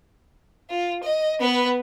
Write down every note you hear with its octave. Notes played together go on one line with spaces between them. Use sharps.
F4
D#5
B3 B4